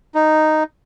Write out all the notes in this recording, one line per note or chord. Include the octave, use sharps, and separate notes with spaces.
D#4